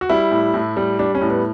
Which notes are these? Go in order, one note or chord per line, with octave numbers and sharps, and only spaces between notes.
F#4
G3 E4
A2
A2
G3
G3 D4
C#4
A2
B3